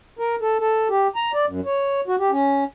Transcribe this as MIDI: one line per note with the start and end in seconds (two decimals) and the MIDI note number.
0.19 0.36 70
0.41 0.58 69
0.60 0.88 69
0.89 1.07 67
1.16 1.32 82
1.34 1.46 74
1.47 1.60 42
1.66 2.01 73
2.08 2.16 66
2.19 2.31 67
2.31 2.64 61